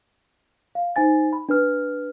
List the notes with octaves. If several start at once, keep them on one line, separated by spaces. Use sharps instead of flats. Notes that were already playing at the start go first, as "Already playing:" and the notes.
F5
D#4 C5 G#5 A6
B5
D4 B4 F6